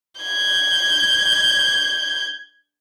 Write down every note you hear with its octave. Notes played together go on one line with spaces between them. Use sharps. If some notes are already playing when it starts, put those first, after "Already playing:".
G6 G#6